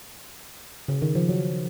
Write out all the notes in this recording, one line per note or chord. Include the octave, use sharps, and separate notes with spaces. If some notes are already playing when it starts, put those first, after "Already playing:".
C#3
D#3
F3
F#3